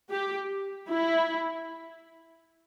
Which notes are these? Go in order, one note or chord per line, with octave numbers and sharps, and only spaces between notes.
G4
E4